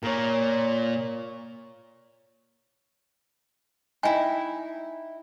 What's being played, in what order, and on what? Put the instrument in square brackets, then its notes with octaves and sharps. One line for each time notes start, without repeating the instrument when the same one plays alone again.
[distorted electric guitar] A#2 [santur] A#4 C#5
[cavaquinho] D#4 E4 [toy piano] G5 G#5